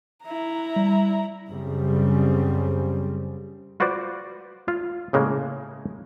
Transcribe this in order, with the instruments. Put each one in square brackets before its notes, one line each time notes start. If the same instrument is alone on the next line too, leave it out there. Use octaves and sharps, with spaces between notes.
[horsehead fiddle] E4 A#5
[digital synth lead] G3
[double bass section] F#2 C#3 G3 C4
[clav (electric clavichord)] F4 F#4 B4 C5 D5
F4
A2 C#3 G#3 A#3